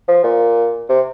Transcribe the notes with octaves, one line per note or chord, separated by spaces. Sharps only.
F3
A#2
C3